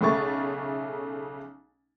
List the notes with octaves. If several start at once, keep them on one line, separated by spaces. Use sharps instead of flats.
B1 C#3 A3 C#6 A6